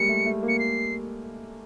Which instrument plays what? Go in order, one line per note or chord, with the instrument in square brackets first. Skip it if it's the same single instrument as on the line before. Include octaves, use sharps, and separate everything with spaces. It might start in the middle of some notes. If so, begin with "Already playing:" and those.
Already playing: [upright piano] G3 G#3 A#3 [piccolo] C#7
[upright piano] A3
A3
A#3
[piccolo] C#7
C7